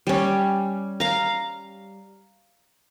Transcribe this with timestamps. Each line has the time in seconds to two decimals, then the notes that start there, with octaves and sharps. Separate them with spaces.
0.07 G3 C#4
1.00 F5 A#5